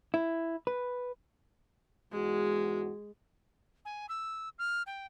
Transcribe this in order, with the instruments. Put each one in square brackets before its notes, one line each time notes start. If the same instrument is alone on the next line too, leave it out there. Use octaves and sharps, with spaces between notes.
[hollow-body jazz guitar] E4
B4
[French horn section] E2 G#2 F#4 [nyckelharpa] G#3
[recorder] G#5
E6
F6
G5